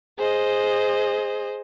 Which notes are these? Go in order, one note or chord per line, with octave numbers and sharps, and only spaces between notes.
G#4 C5 D#5